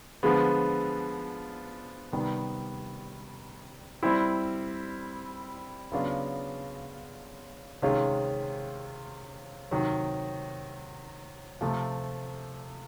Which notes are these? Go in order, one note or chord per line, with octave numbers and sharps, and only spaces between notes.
D3 F3 G#3 B3
C3 D#3 G3 B3
G3 C4 E4
C#3 F#3 B3 D4 F4
C3 D#3 G#3 C#4 F4
C3 D#3 F#3
C3 F3 A3